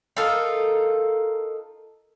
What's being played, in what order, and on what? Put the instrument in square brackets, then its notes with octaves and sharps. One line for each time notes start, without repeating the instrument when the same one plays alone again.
[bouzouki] D#4 F4 A4 A#4